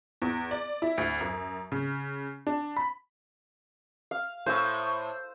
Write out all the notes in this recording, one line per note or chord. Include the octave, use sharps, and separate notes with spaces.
E2
D5
E4
D2
F#2
C#3
D4
B5
F5
A2 C5 E6